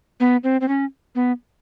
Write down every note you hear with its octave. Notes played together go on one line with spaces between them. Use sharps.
B3
C4
C4
C#4
B3